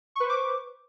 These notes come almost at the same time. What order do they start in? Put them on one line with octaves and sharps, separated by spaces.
C#6 B4 C5 D6